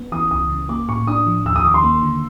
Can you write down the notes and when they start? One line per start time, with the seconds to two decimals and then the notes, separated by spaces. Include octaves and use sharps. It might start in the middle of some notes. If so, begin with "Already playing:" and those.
Already playing: B3
0.12 E3 D#6
0.31 C#2 D#6
0.50 C#3
0.69 A#3 D6
0.88 A2 C#6
1.07 D4 D#6
1.27 F3
1.45 D#2 E6
1.56 D#6
1.65 D#3 D6
1.74 C6
1.84 A#3
2.02 D3